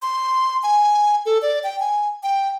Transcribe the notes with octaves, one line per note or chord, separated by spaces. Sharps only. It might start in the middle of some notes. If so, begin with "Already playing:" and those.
C6
G#5
A4
D5
G5
G#5
G5